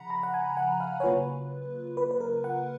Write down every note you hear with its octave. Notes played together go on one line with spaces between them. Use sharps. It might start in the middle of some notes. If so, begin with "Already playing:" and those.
Already playing: C#3 F3 F#5 A#5 B5
A#5
F#5
G#5
F#5
F5
C#5
C#3 F#3 A#3 F4 B4
B4
B4
A#4
F#5